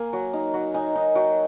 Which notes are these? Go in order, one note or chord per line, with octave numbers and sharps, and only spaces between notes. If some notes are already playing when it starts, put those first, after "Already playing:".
Already playing: A#3 G#5
F#3
D#4
F#3
D#4 G#5
D#4
F#3 G5